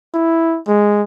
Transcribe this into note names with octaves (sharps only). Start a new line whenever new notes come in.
E4
G#3